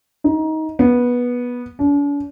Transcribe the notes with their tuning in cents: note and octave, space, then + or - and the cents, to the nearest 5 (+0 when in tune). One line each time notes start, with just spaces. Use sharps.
D#4 +20
B3 -15
D4 -45